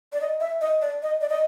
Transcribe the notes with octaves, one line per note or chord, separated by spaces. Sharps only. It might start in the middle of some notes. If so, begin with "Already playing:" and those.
D5
D#5
E5
D#5
D5
D#5
D5
D#5